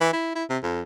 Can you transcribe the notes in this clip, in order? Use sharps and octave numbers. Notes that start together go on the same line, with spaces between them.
E3
E4
E4
C3
F2